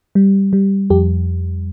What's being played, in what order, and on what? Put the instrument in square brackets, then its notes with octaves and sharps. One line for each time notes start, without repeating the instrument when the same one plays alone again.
[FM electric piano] G3
G3
F2 G4